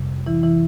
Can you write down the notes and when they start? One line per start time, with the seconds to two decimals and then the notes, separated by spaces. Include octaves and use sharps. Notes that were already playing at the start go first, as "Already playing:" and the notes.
Already playing: F2 C3 G3
0.27 E3 E4
0.43 E3 E4